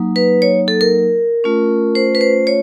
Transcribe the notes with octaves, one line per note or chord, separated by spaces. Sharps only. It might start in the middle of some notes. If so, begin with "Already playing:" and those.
Already playing: F#3 A#3 D#4
B4
C#5
A4
A#4
A3 C#4 F4
C5
B4
C5
C#5